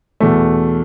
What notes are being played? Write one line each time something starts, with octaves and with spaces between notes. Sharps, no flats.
E2 B2 A3